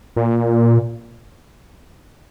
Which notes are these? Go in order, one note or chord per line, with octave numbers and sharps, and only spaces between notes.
A#2